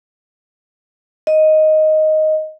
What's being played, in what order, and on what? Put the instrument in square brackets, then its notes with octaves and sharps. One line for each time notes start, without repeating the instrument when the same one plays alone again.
[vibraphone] D#5